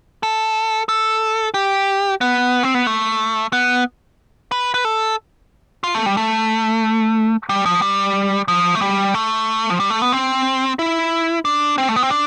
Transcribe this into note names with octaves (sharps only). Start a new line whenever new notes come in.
A4
A4
G4
B3
C4
B3
A3
B3
B4
B4
A4
F4
A3
G3
A3
G3
F3
G3
F3
A3
G3
A3
F3
G3
A3
B3
C4
E4
D4
C4
A3
B3
C4
D4